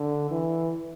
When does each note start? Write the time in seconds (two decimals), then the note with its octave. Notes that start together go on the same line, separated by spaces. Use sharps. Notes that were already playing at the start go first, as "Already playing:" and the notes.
Already playing: D3
0.31 E3